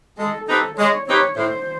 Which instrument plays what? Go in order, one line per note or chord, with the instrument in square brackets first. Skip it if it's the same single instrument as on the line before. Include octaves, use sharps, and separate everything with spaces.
[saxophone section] G#3 [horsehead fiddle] A4
[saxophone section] C4 D#4 G4 B4 [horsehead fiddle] A4
[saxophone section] G#3 [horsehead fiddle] C#5
[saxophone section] C4 D#4 G4 B4 [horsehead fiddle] C#5
[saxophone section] A2 [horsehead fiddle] C5